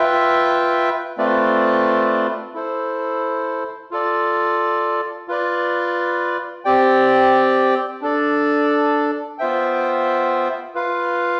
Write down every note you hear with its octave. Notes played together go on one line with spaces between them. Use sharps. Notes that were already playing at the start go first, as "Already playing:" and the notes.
Already playing: F4 B4 E5 G5
A3 C4 F4 B4 D5
E4 A4 C5
F4 A4 D5
F4 B4 D5
C4 G4 D5 G5
D4 A4 D5
B3 F4 C5 E5 G5
F4 B4 F5